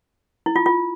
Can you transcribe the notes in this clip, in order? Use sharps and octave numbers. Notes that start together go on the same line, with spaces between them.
E4
F4
F4